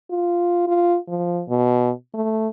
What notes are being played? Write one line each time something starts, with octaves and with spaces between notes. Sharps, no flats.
F4
F4
F3
B2
A3